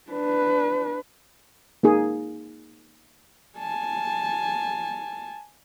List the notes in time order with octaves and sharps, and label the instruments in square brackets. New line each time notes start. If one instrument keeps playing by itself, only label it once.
[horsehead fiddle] D4 B4
[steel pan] A#3 D#4 G#4
[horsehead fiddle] G#5 A5